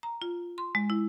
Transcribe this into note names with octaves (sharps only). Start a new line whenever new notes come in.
A#5
F4
C6
G#3
E4